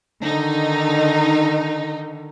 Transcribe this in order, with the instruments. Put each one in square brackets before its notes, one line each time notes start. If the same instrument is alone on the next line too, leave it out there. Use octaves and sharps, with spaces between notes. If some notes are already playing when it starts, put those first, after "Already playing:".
[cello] D3 D#3 [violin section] D#4